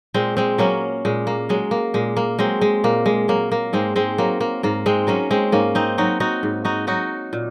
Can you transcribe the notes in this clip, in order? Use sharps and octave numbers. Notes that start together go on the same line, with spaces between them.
A#2 G#3 C4
G#3 C4
F#3 A#3 C#4
A#2 G#3
A#3
F#3 G#3
A#3
A#2 G#3
A#3
F#3 G#3 C4
G#3
A#2 A#3
G#3
F#3 A#3
A#3
G#2 G#3 C4
G#3 C4
F#3 A#3
A#3
G#2 A#3
G#3 C4
F#3 A#3 C#4
G#3 C4
G#2 A#3 C#4
C4 D#4
F#3 D#4 F#4
D#4 F#4
G#2
D#4 F#4
F#3 D#4 F#4
A#2